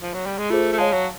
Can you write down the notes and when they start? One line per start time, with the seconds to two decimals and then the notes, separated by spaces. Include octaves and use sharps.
0.02 F3
0.14 F#3
0.26 G3
0.38 G#3
0.50 A3 F4 G#4 C5
0.72 A3
0.78 G#3 C#5 F5 A5
0.93 F#3